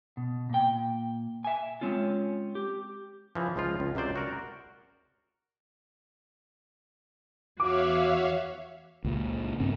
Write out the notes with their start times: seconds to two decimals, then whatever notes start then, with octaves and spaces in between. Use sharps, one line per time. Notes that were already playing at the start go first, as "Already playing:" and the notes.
0.17 B2
0.50 A#2 G5
1.44 E5 G#5
1.81 G#3 C4 C#4 F4
2.55 G4
3.35 C#3 E3 F3
3.56 C#2 F3 G#3 F4
3.80 C#2
3.95 C#2 C3 F#3 C5 D5
4.16 F#4 A#4 D5
7.60 E2 F#4 C#5 E5 F5 D6
9.04 C#2 A#2
9.60 G2 C4 C#4